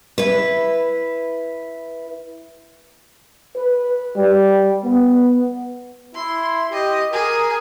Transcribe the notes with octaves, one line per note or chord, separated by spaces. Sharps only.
E4 B4
B4
G3
B3
E4 C6
G4 D#5
G#4 A#4